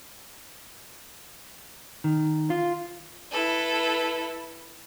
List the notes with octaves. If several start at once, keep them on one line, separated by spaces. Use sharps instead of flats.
D#3
F4
E4 A4 B4